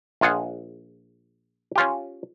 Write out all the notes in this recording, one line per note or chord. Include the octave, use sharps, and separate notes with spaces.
A#1 F4 G#4 F#5
C#4 F4 G4